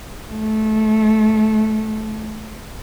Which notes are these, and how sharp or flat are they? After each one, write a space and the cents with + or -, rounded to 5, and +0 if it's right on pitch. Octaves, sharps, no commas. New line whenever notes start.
A3 -20